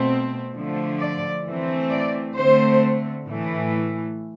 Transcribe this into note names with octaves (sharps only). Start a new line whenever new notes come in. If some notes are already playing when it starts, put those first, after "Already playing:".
Already playing: B2 A3 C4
D3 F3 A3
D5
E3 A3 C4
D5
D3 A3 C4 C5
A2 E3 A3